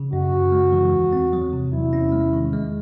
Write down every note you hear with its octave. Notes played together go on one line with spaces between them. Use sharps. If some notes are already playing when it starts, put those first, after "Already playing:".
Already playing: C#3
F#2 F#4
F#2
G#3
E3
E2
C4
F#3
C3
E2 E4
C#4
G#3
D#3
G#3